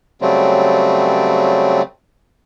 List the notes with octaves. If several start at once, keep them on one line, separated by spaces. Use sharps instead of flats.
C#3 F#3 G3 A3 C4